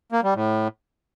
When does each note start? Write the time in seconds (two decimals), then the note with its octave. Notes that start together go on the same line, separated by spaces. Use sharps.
0.12 A#3
0.23 G3
0.34 A2